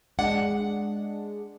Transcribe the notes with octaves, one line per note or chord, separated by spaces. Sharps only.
G#3 D4 F#5